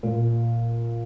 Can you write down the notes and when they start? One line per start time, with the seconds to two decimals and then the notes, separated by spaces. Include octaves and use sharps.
0.03 A#2